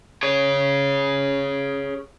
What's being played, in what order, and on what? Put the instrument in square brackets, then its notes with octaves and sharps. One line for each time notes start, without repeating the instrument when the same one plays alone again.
[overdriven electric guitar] G#4 C#5